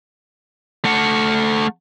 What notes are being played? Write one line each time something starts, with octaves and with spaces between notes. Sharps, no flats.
A3 F#5